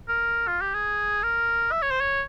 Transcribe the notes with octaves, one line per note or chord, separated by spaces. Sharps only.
A#4
F4
G4
G#4
A#4
E5
C#5
C5
C#5